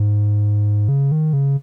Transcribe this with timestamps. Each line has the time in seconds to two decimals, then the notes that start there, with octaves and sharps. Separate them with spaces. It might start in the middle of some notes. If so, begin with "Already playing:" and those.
Already playing: G#2
0.89 C#3
1.12 D#3
1.33 C#3